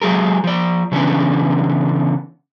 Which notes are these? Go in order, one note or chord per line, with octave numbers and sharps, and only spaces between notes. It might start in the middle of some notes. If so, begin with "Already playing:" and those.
F#3 G#3 G#4 A#4
F3 D5
C#3 E3 B3 C#4 D4